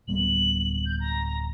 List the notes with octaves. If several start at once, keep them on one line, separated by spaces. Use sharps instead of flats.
D1 G3 B3 F#7
G6
A#5